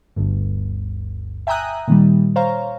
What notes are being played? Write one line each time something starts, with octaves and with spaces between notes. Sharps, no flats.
G1 D2 G2
E5 G5 G#5 A#5 D#6 F#6
A#2 D#3 G3
C5 C#5 F5 A#5